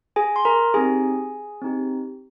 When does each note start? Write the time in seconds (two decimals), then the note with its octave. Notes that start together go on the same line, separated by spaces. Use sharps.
0.16 G#4 G#5
0.36 C6
0.45 A#4 A#5
0.74 C4 D#4 G4 G#4 G#5
1.62 C4 D#4 G4